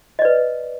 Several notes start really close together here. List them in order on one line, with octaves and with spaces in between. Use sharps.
D#5 D5 B4